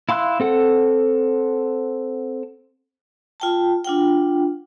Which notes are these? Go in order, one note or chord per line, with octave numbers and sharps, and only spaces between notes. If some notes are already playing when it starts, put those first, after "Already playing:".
E4 F5 C6 E6 F#6
C4 A4 F#5
F4 G5 A5
D4 F4 F#5 G5